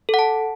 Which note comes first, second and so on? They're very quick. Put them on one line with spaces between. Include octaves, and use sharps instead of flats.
A4 F#5 A5